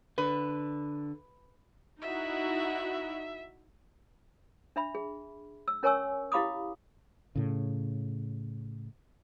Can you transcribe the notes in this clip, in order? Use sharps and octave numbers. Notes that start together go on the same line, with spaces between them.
D3 B4
D#4 E4 F#4 E5
D4 E5 B5
G#4
E6
C#4 A#4 C#5 G#5 C#6 E6
E4 G4 F5 B5 D6 D#6
A2 C#3